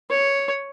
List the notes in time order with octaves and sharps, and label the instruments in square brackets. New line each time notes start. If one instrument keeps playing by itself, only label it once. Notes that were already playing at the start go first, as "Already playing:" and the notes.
[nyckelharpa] C#5